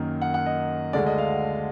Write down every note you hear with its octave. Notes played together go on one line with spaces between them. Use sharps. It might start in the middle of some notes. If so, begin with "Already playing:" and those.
Already playing: F#2 D#3 A#3
F#5
F#5
D#5
D2 D3 G#3 D5
D#5
F5